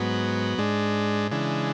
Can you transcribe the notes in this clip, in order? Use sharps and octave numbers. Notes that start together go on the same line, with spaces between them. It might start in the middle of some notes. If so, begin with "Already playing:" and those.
Already playing: G#2 F#3 B3
G#2 G#3 D4
C#3 E3 G#3 D4